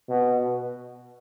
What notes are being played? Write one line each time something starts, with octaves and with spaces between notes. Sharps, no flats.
B2